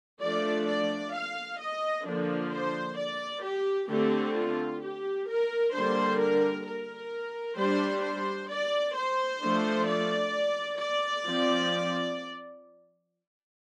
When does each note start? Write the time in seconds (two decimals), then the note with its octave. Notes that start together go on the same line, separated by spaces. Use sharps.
0.22 F3 A3 D4 D5
0.68 D5
1.14 F5
1.60 D#5
2.06 D3 F3 A#3 D4
2.52 C5
2.98 D5
3.43 G4
3.90 D3 A3 C4 G4
4.36 F4
4.82 G4
5.28 A#4
5.73 D3 G3 A#3 D4 C5
6.20 A#4
6.66 A#4
7.58 G3 D4 C5
8.04 C5
8.50 D5
8.96 C5
9.42 F3 A3 D4
9.88 D5
10.79 D5
11.26 F3 C4